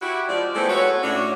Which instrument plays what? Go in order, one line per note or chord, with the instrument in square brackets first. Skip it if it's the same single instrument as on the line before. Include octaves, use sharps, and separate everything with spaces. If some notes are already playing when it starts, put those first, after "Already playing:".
[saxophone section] E4 F#4 G4
F3 G#3 D5
G#3 A3 B3 C4 E4 A4
F#4 A4 B4 C#5
A2 C#4 D4 F#4